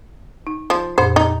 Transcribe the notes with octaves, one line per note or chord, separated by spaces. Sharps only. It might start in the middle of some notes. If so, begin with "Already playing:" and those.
D#4
F3
F2 A#2 C5
D#4